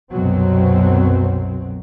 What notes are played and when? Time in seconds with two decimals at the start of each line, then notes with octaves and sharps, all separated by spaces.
0.10 C2 F#2 B2 F#3 C4